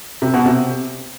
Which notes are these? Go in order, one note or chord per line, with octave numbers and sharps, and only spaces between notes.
C3
B2
C3